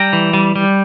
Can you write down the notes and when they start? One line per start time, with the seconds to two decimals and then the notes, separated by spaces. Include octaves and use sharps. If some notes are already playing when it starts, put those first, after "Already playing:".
Already playing: G3 G5 A#5
0.13 E3
0.33 G3
0.56 G3